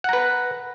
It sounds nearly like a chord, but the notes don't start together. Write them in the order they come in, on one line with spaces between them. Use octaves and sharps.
F#5 A#5 B4